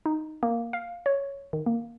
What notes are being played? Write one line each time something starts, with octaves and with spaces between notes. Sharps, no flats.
D#4
A#3
F5
C#5
D#3
A#3